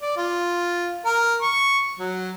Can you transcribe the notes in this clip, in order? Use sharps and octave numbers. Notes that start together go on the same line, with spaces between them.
D5
F4
A#4
C#6
F#3